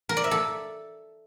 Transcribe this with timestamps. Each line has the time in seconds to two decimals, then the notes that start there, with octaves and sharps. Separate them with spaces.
0.09 A#4
0.17 D5
0.24 E5
0.31 A4